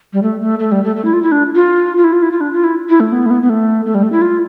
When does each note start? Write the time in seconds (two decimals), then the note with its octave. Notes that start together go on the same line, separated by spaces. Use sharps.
0.13 G3
0.23 A3
0.42 A3
0.59 A3
0.72 G3
0.84 A3
0.96 A3
1.05 E4
1.13 F4
1.23 E4
1.32 D4
1.55 F4
1.97 F4
2.04 E4
2.13 F4
2.22 E4
2.32 F4
2.41 D4
2.53 F4
2.64 E4
2.89 E4
3.00 A3
3.12 B3
3.26 A3
3.30 B3
3.42 B3
3.50 A3
3.85 A3
3.95 G3
4.03 A3
4.12 E4
4.22 F4